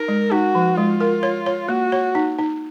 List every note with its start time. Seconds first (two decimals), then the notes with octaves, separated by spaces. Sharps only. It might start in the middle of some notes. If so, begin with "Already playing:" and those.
Already playing: D#4 A#4
0.08 G#3
0.32 D#4 F#4
0.55 F3
0.77 G#3 F4
1.00 A#4
1.23 C#5
1.46 C#5
1.69 A#3 F#4
1.92 C#5
2.15 D#4
2.39 D#4